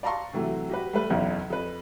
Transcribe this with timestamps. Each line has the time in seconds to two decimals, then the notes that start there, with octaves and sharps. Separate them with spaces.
0.03 D5 F5 A5 A#5 C6 C#6
0.33 C3 E3 F#3 A3
0.70 F#4 G4 B4
0.93 G3 A3 B4
1.10 F#1 B1 E2
1.50 F2 B4